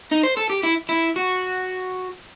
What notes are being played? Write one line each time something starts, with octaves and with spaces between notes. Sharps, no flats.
D#4
C5
A4
G4
E4
E4
F#4